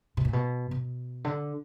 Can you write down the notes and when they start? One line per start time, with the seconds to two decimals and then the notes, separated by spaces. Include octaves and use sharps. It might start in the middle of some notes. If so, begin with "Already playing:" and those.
0.17 B2
0.25 A#2
0.33 B2
0.71 B2
1.25 D3